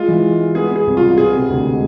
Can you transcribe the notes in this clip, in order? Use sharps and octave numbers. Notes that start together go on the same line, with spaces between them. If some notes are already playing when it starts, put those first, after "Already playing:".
Already playing: G#3 F4
E3
G#3
G#3
B3 G#4
B3 G#4
C2
F4
B2
B3 G#4
C3
D2
G#3